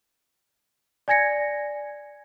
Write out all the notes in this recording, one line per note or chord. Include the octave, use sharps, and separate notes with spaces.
D5 G#5 G#6 A#6 C#7